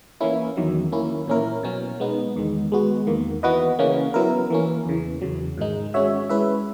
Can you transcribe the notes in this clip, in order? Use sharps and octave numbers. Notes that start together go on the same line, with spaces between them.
E3 A#3 C#4 E4
E2 D#3 F#3
A#3 C#4 E4
A#2 A#3 C#4 E4 A#4
B2 F#3 C#4
G#3 B3 D#4
E2 D#3 G#3
G#3 B3 F#4
E2 D#3 A#3
E3 B3 F#4 B4 D#5
C#3 E3 A#3 C#4
F#3 B3 E4 A#4
E3 A#3 C#4
E2 C#3 E3
E2 C#3 F#3
G#2 D#3 G#3 D#4
G#3 C#4 F#4 C#5 E5
G#3 C#4 E4 B4 E5